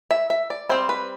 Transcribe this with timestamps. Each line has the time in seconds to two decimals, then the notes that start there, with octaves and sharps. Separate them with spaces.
0.11 E5
0.30 E5
0.50 D5
0.69 G3 C4 E4 C5
0.89 B4